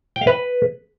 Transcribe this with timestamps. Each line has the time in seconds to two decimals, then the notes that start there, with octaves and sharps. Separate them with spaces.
0.16 G5
0.21 F5
0.27 B4